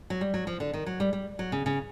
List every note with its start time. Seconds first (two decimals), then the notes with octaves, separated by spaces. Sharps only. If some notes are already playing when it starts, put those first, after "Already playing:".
0.10 F#3
0.21 G3
0.34 F#3
0.47 F3
0.60 D3
0.73 D#3
0.86 F#3
1.00 G3
1.13 G3
1.39 F#3
1.52 C#3
1.66 C#3